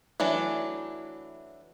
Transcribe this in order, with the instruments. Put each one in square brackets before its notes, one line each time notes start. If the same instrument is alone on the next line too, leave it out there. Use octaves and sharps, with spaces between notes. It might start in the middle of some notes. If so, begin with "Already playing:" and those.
[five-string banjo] E3 F#3 A3 D4